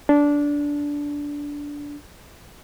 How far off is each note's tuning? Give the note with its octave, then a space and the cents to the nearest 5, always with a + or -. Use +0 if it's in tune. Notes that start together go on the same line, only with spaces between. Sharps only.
D4 -15